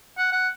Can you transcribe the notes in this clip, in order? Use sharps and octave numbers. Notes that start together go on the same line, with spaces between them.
F#5
F#5